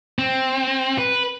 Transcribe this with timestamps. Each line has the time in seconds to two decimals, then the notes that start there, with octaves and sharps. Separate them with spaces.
0.19 C4
0.99 B4